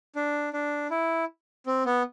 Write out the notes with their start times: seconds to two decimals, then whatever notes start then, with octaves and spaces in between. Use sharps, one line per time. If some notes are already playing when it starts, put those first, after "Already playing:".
0.15 D4
0.53 D4
0.91 E4
1.66 C4
1.85 B3